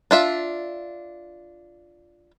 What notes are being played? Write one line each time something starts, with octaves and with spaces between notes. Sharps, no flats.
D4 F4 E5